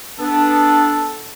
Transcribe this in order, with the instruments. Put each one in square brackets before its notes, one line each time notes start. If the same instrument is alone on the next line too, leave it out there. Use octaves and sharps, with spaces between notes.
[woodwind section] B3 D4 [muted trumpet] A4